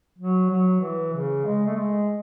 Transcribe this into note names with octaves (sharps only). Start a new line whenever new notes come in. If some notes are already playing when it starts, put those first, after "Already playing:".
F#3
F#3
E3
C#3
G#3
A3
G#3